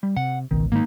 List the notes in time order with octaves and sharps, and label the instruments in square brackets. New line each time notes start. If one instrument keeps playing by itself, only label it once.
[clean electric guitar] G3
[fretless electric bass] C3 [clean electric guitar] F#5
[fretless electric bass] G#1 C#2 B2 [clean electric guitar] D#3
[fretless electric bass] G#2 D#3 G#3 [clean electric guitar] A#3 D#4